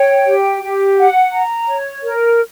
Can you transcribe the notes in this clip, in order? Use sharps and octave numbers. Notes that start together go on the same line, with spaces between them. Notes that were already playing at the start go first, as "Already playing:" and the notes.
Already playing: C#5 G5
G4
G4
F#5
A#5
C#5
A#4